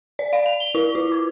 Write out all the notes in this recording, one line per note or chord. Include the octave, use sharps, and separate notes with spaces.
D5
F5
F7
G7
E4
F4
D6